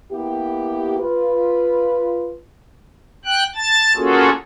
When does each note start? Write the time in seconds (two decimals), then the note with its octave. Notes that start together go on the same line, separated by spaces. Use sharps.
0.12 A#3 B3 E4 G4
1.00 F4 B4
3.25 G5 F#6
3.55 A5 A6
3.96 A#3 C#4 F4 F#4 G#4 A4